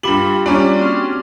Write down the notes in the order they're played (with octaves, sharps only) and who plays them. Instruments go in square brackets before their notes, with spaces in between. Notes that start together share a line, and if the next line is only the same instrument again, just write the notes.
[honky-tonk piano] G2 F#7 [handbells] F4 G4 B5
[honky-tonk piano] G3 C#4 D4 [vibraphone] A#3 D5 [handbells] F4
[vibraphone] C4 [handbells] F#4 F6